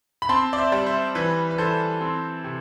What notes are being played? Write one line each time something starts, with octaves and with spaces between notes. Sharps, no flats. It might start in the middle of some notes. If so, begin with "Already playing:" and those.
B5
C4 A5 C6
D5
C5 E5
G3
C5 E5
E3 B4
B4
E3 A4 C5
C4
C3